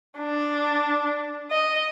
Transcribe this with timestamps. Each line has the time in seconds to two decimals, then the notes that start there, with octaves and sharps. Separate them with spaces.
0.18 D4
1.51 D#5